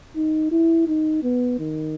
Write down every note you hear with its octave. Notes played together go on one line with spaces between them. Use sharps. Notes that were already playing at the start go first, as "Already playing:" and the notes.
D#4
E4
D#4
B3
D#3